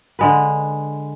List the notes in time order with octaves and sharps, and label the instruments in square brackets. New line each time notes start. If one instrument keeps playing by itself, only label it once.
[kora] D3 G#3 B4